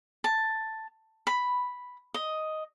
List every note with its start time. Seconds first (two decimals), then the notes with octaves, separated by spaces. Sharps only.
0.24 A5
1.27 B5
2.14 D#5